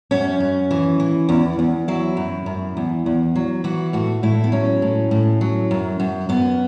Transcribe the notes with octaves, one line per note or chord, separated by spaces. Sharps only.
F#2 C#4
F#2
E3
E3
E2
E2
F#3 E4
F#2
F#2
E2
E2
F#3
E3 F#4
A2 F#4
A2 E4
B3
F#3 C#4
A2
A2
F#3
F#2
F#2
F#2 B3